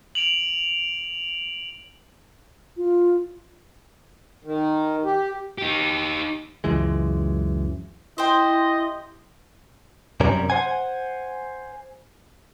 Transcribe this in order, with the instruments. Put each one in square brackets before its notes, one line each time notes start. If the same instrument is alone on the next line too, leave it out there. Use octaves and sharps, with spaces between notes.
[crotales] D7 F7 F#7
[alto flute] F4
[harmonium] D#3
G4
[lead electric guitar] D#4 G4
[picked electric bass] C#2 F#2 E3 G#3
[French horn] E4 [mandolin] G4 C5 [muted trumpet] D#5
[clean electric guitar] F#2 C3 G3 C#4 A#4
C5 F#5 G#5